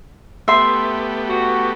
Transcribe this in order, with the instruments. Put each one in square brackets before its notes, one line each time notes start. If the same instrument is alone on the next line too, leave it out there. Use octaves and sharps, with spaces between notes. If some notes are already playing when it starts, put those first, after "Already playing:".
[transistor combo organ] A3 B3 G4 [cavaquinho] E5 C6
[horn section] F#4